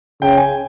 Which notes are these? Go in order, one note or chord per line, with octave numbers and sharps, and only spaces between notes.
C#3 G5
G#5